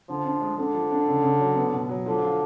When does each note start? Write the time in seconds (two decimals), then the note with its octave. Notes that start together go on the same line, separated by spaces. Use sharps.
0.08 D3 F3
0.25 D4
0.41 G#3
0.57 D3 D4
0.75 F3
0.91 D4
1.08 C#3
1.23 C#3
1.39 F#3
1.56 B3
1.73 B2
1.89 F#3
2.06 D3 F3
2.22 F4